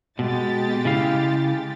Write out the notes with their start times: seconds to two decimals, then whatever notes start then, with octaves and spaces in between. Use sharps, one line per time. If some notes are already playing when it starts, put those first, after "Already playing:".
0.19 B2 G#3 G4 A6
0.85 C#3 E4 F5